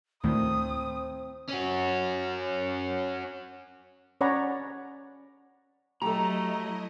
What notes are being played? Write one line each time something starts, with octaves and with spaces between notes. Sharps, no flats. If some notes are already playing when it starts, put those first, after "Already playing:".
D2 A2 D#3 C4 D#6
C#4 F#4
C#4 C#5 D5 F#5 A#5 B5
F#3 A3 E4 G4 A4 D#5 A#5